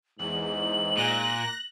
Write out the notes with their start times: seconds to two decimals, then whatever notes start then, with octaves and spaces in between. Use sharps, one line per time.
0.19 E2 G#2 F#7
0.97 A#2 F#6 A#6